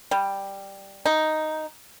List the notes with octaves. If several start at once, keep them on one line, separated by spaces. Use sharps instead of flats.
G3
D#4